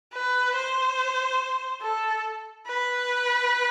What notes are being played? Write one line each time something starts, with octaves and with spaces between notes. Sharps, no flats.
B4
C5
A4
B4